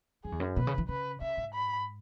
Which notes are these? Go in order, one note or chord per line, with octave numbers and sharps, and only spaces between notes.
F#2 G#4
E2
F#2
B2 B4
C#3
E3
C#3 B4
C#3 E5
G#2
B5